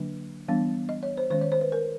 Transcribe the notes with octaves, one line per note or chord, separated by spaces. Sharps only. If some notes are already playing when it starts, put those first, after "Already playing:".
Already playing: D3 F#3 A#3 D4
E3 G3 B3 D4
D#5
C#5
C5
D#3 G#3 C#4 C5
C#5
C5
B4
A#4